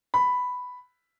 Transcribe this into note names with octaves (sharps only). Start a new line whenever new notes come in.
B5